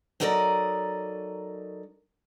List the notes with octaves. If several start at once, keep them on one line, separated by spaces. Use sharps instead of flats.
F#3 D#4 A4 A#4 D5 D#5